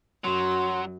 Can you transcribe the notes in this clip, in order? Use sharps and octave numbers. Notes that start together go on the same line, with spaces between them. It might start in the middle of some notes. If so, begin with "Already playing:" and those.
F#2 F#3 C6